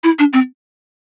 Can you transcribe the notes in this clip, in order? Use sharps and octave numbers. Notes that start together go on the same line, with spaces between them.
E4
D4
C4